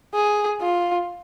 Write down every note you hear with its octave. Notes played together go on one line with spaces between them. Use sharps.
G#4
F4